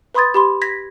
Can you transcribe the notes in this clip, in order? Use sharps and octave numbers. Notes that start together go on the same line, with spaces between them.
B4 B5 C6 D#6 G#6 A6
G4 B5 C6
G#6 A#6 B6